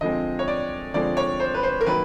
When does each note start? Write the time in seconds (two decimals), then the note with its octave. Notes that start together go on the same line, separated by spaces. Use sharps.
0.01 D3 F3 G#3 C4 D#5
0.39 C#5
0.48 D5
0.94 D3 F3 G#3 C4 D5
1.17 C#5
1.40 C5
1.54 B4
1.63 C5
1.81 A#4
1.86 D#3 F#3 A#3 B4